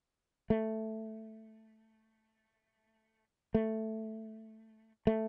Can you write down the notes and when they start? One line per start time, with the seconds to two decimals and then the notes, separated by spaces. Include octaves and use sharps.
0.50 A3
3.55 A3
5.07 A3